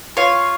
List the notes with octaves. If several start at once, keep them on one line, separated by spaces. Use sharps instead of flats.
F4 C#5 F5